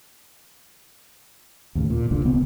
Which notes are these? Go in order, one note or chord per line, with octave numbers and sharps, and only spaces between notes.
D#2 A2 C#3
A#2
F1 C2 A#2 D3
D1 C#3 B3 C4